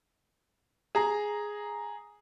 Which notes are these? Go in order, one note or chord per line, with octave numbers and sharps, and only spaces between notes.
G#4 A#5